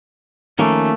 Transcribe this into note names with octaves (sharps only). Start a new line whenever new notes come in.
D#3 F3 A3 A#3 C#4